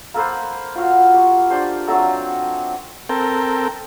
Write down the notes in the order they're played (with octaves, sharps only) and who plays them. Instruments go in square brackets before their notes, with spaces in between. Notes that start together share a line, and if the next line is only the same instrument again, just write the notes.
[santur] A#3 A4 B4 C5
F4 F#4 F5
G4 C#6
D4 G4 C5
F#3 A3 C4 A4
[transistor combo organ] C4 A4 A#4 G5